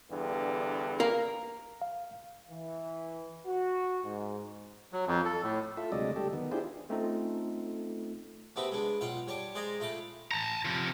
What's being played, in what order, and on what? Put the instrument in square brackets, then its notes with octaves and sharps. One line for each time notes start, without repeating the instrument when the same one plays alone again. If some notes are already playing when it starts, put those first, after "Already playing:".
[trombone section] E2 G2 D3
[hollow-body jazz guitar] A#4 F5
[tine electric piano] F5
[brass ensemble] E3
F#4
G#2
[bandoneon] F#3
F2
A4
A2
[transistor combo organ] F4 A4 E5
D2 C3 F#3 G#3 D5 D#5
D2 G3 G4 A4
D#3 B3
D4 E4 F4 G4 G#4 C5
[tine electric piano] A3 C4 C#4 D#4 F4 A4
[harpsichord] A3 B3 C4 F#4 G4 B4
G#3 B3 D4
B1 F4 F#5 G5
G3 C#5 A5 D6
G#3 C5 D5 D#5 G#5 A#5
A3 F4 G5 A5 B5
[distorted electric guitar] A5 A#5
C3 F3